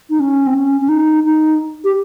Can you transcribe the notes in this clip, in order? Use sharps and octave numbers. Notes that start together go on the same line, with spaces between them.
D#4
C#4
C4
C#4
C#4
D#4
D#4
G4